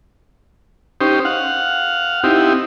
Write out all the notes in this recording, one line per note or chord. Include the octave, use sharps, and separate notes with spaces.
C#4 D#4 G4 C5
F5 F#5
C4 D#4 E4 G4